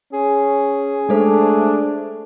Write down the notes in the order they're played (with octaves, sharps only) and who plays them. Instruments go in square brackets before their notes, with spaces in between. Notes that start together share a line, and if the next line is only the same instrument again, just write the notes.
[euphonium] C#4 [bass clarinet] G#4
[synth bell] G#3 A4 C5 [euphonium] A3 [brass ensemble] D4